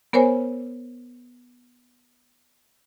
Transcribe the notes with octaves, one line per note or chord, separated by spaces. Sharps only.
B3 A#4 C5 C#5 G#5